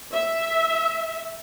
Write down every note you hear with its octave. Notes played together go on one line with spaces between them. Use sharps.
E5